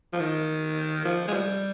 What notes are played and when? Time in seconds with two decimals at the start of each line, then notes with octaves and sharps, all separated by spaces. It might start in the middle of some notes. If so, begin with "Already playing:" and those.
0.13 F3
0.20 D#3
1.05 F3
1.28 G#3
1.33 G3